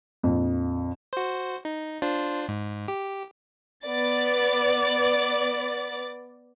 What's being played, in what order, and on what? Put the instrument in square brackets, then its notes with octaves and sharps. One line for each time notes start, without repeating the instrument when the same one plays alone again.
[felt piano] A#1 F2
[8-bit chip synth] F#4 C5
D#4
D4 F4 C5
G#2
G4
[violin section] B3 D5 A6